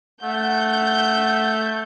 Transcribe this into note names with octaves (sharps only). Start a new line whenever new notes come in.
A3 F#5 G6